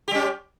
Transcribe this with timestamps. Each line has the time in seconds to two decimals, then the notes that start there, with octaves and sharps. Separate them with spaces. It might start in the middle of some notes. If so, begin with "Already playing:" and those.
0.08 G4
0.11 G3
0.15 C#4